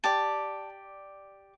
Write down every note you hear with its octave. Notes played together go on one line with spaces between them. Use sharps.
G4 D5 A5